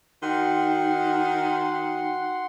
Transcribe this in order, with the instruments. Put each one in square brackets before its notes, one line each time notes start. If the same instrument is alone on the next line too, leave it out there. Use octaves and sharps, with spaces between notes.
[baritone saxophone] D#3 [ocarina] D#4 [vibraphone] F#4 G5 [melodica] F#5 C6